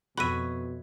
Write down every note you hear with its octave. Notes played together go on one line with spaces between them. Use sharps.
F2 B2 F#4 C#5 E5 B5 D#7